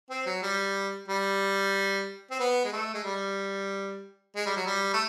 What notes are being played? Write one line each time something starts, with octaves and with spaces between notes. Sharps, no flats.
C4
F#3
G3
G3
C4
B3
G#3
A3
G#3
G3
G#3
G3
F#3
G3
A3